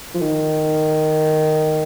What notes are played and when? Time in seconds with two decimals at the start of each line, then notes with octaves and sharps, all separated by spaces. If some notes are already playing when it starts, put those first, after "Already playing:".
0.14 F3
0.22 D#3